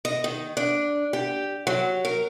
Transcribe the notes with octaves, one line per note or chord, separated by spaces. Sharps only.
D#5
D#3
D4
G4
F#3
A#4